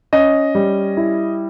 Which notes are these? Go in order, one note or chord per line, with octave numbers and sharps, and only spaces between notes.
C#4 D#5
G3
E4